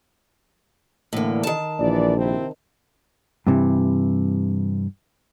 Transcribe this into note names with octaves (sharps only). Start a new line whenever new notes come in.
A2 D3 E3 A#3
D#3 A5
A#1 E3 D5
C3 C4 E4
G2 C3 E3